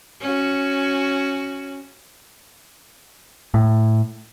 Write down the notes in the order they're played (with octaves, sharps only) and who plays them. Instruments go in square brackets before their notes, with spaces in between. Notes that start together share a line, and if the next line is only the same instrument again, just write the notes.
[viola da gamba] C#4 F#4
[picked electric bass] A2